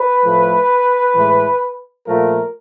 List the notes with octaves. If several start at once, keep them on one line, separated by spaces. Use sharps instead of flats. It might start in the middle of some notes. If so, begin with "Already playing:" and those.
Already playing: B4
A2 F3 A3
A2 E3 G#3
A#2 F3 A3 A#4